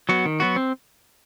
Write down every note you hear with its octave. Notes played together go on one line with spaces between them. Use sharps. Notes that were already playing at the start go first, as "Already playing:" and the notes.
F#3 B3 F#4
D#3
F#3 B3 F#4
C4